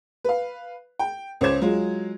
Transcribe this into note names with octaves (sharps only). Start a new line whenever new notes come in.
B4 F5
G5
C#2 C#4 C5 D6 G#6 E7
F#3 G#3 F4